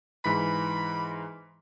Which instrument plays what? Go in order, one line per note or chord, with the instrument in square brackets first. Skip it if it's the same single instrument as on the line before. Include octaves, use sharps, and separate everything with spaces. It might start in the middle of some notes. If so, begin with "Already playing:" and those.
[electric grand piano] G#2 E3 B6 [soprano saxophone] B5